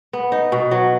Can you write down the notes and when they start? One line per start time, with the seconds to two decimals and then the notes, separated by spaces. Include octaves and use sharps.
0.13 B3
0.32 D#4
0.52 B2
0.71 F#3